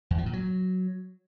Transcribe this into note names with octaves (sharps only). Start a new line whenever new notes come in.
E2
F3
A#2
F#3